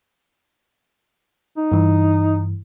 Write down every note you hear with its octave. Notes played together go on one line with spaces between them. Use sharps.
D#4
G2 E3